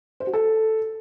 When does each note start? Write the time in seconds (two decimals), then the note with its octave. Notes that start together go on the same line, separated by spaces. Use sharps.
0.20 C5
0.27 F#4
0.33 A4